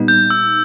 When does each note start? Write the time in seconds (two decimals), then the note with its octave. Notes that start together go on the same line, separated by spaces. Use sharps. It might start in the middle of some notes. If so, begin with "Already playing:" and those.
Already playing: A#2 G3 B3 D#4
0.08 G6
0.30 E6